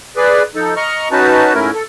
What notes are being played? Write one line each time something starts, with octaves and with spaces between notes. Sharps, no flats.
G#4 B4 D5
F3 D#4 A4
D#5 A#5 C#6 F6
C#4 D#4 F#4 B4 A5
G#2 A3 C#4 E4 A#4
A4